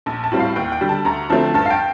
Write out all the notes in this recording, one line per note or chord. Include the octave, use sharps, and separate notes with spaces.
A#1 A5
A5
A2 G3 C4
F5
D#2 G5
G5
D3 G3
A5
D2 A#5
D3 F3 A3 C4 A5
G2 A5
F5
G5